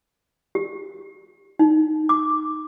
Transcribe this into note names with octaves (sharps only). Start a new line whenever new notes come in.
G4
D#4
D6